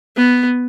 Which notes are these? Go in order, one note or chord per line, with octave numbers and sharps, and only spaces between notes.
B3